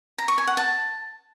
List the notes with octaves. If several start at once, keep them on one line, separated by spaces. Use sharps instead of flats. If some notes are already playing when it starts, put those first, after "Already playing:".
A#5
C#6
G#5
F#5
A5